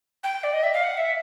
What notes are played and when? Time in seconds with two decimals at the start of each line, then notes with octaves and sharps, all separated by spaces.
0.23 G5
0.43 D5
0.52 D#5
0.63 E5
0.73 F5
0.82 F#5
0.97 E5